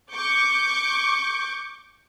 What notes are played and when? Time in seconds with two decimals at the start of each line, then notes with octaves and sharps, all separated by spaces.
0.12 C#6 D6 G6